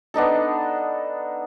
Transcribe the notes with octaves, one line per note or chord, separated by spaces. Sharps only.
B3 D4 D#4 A4